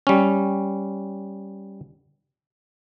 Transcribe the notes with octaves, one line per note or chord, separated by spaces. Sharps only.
G3 C#4